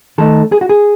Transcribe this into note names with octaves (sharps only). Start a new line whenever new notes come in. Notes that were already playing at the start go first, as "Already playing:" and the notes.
D#3 A3 D#4 A4
G#4
F#4
G#4